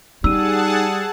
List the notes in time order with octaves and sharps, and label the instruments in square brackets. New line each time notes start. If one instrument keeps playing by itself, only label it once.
[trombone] G3 [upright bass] D#4 [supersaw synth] G#4 F#5 A5 [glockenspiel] E6 D#7